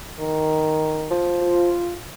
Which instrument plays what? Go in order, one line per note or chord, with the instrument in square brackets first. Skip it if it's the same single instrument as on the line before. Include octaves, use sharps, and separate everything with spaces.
[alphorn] D#3
[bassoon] F3
[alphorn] F4